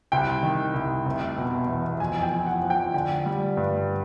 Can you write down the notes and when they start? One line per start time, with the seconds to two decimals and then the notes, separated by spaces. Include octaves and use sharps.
0.12 C2 G5
0.43 D#3
0.74 C2
1.05 F1
1.38 B2
1.68 E2
2.00 F2 G#5
2.19 G#5
2.23 G5
2.32 F3
2.46 F#5
2.62 F3
2.70 G5
2.94 D3 G5
3.26 G3
3.57 G2